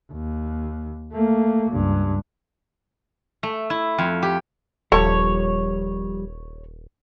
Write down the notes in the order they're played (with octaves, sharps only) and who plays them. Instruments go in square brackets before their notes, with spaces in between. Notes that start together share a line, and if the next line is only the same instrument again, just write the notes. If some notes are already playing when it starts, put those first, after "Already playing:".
[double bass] D#2
A3 A#3
C#2 G2
[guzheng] A3
E4
F2
G4
[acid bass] D#1 [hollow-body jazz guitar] F3 G3 [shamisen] A4 A5 [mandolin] C#5